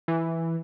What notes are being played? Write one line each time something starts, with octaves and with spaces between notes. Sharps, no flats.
E3